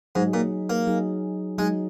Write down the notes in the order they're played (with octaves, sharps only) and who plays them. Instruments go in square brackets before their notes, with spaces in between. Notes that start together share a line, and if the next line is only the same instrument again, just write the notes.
[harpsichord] G#2 [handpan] F#3 D#4 G#4
[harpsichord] A#2
A#3
[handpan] F#3 D#4 G#4
[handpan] F#3 D#4 G#4 [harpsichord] G#3